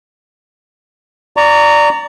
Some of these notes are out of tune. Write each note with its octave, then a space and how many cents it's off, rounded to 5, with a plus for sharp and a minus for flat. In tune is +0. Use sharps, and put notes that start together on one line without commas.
D5 +0 A#5 -15 C#6 +30